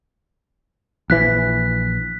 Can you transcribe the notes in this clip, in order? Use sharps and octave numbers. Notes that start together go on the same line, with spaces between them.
A#1 E3 F#6 B6